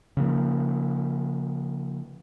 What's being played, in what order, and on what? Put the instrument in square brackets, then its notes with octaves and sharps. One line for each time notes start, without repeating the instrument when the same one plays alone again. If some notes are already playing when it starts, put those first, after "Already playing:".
[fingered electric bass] C#3 F3 A#3